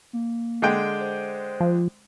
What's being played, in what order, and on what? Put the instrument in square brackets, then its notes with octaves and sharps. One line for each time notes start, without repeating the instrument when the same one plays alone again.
[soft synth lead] A#3
[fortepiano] D3 G#3 G5
[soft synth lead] C5
[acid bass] F3